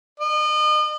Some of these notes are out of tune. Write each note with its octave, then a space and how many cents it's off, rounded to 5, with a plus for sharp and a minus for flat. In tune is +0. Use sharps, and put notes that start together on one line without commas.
D#5 -40